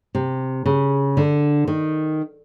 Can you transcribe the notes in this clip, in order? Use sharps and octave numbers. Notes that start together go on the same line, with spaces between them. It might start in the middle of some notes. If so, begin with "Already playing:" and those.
C3
C#3
D3
D#3